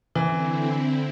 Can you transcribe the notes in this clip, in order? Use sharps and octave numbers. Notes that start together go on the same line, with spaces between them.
D3 E3 C4 E4